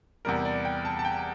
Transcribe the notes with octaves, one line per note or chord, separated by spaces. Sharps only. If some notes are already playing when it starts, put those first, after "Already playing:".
E2 C3 G3 A#4
D5
G5
A5
A5
G5